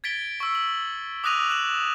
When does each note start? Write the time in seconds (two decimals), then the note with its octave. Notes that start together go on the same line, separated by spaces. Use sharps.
0.04 G#6 A6 B6 D7 G7
0.40 C#6 E6
0.55 F#7
1.24 D6 D#6 F#6 A#6 D#7 F7
1.50 F#6 E7 F#7